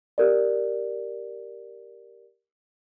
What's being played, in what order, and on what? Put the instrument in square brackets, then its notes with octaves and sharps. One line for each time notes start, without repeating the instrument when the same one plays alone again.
[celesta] G4 A#4 D5